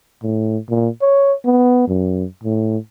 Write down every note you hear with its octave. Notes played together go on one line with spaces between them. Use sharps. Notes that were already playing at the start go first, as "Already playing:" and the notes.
A2
A#2
C#5
B3
F#2
A2